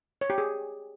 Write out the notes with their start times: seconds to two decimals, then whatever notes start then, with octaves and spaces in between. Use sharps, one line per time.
0.21 C#5
0.30 G4
0.38 G#4